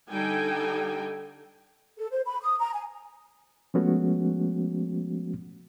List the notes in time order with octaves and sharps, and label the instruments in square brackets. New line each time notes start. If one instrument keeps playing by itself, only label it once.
[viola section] D3 G3 D#4 A4 G5 G#5
[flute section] A4
C5
B5
D#6
A#5
G#5
[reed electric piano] F3 G#3 A3 B3 C#4 F#4